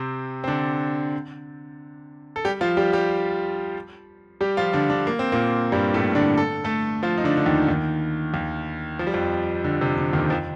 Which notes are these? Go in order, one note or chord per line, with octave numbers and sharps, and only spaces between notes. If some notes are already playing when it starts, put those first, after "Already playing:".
Already playing: C3 C4
C4
D3 D4
A4
G3 G4
F3 F4
G3 G4
G3 G4
G3 G4
F3 F4
D3 D4
D3 D4
A#3
C4
A#2 A#3
G2 G3
A2 A3
D3 D4
A4
A3 A4
F3 F4
D#4
D3 D4
D3
D#2 D#3
D#2 D#3
D#2 D#3
F3
G3
F2 F3
D3
C3
D3
D#2 D#3
F2 F3